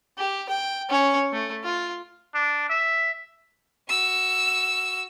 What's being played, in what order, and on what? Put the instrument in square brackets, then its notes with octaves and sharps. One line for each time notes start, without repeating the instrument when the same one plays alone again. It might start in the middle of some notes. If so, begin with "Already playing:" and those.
[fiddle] G4
G5
C#4 C#5
A3
F4
[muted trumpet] D4
E5
[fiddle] F#4 E6